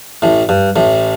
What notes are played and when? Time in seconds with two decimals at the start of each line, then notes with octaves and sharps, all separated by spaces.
0.22 A1 A2
0.49 G2
0.76 A1 A2